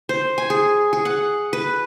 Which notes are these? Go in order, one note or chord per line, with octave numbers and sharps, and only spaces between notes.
C5
G#5
G#4
G#4
F#5
B4